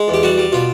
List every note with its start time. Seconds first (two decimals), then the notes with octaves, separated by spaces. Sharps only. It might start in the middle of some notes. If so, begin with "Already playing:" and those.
Already playing: G#3
0.08 E2
0.14 G4
0.23 G3 F#4
0.38 G3
0.52 B2 F4